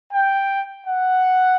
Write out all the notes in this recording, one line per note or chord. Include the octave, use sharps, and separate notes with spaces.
G5
F#5